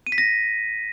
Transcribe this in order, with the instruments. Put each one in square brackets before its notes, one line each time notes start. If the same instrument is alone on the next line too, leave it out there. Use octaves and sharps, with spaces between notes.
[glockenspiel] D#7
B6
A#6